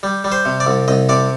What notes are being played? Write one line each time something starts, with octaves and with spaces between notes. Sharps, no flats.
G3
G3
C5
C3
D5
C2
C2 D#5
C3 D5